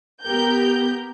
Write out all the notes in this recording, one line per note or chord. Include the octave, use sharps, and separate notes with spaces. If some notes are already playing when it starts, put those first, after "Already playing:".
B3 G4 A#4 G6